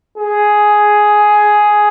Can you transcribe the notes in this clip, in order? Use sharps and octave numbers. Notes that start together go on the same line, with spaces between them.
G#4